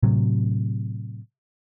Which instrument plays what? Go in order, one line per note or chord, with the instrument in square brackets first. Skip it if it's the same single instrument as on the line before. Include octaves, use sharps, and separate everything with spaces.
[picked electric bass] A2 C3 F#3